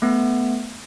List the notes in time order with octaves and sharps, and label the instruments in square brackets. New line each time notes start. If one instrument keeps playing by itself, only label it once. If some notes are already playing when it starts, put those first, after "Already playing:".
[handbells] A3 B3